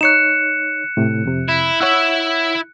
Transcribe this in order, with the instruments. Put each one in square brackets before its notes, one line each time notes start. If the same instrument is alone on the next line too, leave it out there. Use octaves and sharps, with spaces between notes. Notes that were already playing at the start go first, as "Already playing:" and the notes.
[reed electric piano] D#4 C#5 [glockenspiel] F#6 C#7 E7
[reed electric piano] A2 C3
F2 C3
[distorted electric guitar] E4
[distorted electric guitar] E4 E5 [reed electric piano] C#5 F#5 E6